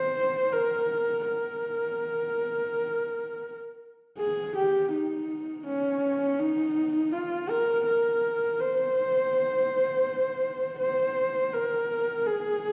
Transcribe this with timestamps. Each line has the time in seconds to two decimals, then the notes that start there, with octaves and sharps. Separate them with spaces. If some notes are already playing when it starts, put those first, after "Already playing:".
Already playing: C5
0.52 A#4
1.26 A#4
4.18 G#4
4.56 G4
4.93 D#4
5.66 C#4
6.39 D#4
7.12 F4
7.49 A#4
7.86 A#4
8.60 C5
10.79 C5
11.53 A#4
12.27 G#4